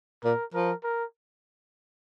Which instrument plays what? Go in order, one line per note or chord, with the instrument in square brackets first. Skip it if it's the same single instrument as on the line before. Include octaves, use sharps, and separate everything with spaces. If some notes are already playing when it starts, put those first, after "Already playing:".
[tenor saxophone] A#2 [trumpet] A#4
[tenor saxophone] F3 [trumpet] A#4
[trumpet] A#4